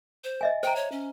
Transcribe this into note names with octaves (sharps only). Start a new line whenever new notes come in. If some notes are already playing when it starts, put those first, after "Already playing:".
C5
D#5 E5 G#5
C5 G5 A#5
C#5
C#4